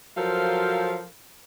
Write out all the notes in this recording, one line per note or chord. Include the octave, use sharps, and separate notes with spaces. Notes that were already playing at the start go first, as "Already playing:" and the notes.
F3 F#3 A4 A#4 C5 F5